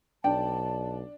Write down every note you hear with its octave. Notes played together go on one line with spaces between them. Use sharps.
B1 D4 G5 A5